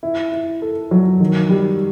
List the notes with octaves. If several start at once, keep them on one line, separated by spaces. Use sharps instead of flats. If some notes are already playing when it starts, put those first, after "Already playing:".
E4
E4
A4
F#3
D#3
G3